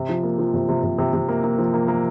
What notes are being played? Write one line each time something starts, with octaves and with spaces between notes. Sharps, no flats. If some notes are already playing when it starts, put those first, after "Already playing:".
Already playing: C3
F3
A#3
F3
C3
C3
C3
C3
C3
A#3
A#3
F3
A#3
A#3